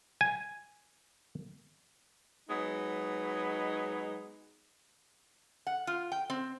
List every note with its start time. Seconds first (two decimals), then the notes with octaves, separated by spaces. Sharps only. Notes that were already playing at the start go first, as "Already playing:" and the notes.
0.21 G#5
2.49 F#3 G#3 B3 D#4
5.67 F#5
5.87 F4
6.12 G5
6.30 C4